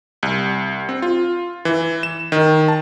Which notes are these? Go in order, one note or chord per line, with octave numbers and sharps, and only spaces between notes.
C2
C4
F4
E3
E7
D#3
A5